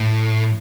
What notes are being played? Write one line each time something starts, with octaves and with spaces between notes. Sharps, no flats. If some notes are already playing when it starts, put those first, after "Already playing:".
Already playing: A2